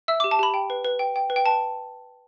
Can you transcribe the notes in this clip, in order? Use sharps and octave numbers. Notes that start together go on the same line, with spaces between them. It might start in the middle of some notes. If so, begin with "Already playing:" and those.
E5 E6
D6
G4
A5
G4 B5
G5
B4
B4
G5
G5
B4
G5
B4 A5